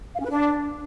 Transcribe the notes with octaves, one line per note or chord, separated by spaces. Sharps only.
F5
C#4
B4
D4